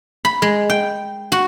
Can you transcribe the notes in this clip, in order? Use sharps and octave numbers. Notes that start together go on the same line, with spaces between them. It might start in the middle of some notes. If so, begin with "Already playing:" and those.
B5
G#3
G5
F#4